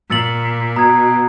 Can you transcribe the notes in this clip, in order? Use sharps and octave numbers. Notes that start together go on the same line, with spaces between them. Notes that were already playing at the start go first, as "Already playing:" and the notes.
A#2 E6 A6 C#7 F#7
B2 A#5 D#6 G#6